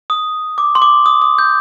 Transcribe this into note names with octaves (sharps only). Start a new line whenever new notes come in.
D#6
D6
C6
D6
D#6
D#6
G6